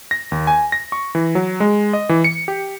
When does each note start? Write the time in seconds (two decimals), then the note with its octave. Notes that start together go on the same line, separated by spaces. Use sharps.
0.11 A#6
0.32 D#2
0.47 G#5
0.72 A#6
0.92 C#6
1.15 E3
1.35 F#3
1.60 G#3
1.93 D#5
2.09 E3
2.24 C#7
2.48 G4